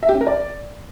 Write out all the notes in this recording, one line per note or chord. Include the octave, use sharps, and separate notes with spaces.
E5
G4
C#4
A#4
D5